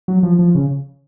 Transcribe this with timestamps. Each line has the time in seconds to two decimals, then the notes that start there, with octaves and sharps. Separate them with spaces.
0.08 F#3
0.23 F3
0.39 F3
0.55 C#3